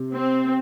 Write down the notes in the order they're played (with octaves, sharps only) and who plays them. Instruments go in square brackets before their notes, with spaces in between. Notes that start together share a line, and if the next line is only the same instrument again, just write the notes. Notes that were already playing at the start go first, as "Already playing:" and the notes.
Already playing: [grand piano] C3
[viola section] C4